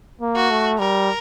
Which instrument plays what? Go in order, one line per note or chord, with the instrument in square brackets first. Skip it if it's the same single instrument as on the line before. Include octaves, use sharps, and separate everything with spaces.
[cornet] A#3
[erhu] F#4
[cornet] A3
[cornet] G3 [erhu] A#4